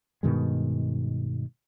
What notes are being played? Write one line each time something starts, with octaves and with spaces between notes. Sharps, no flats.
G2 B2 D#3 G#3